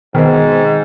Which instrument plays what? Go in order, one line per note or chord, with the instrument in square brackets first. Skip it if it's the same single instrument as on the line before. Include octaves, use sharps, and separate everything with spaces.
[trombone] G#2 [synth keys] B2 B3 C4 [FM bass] D#3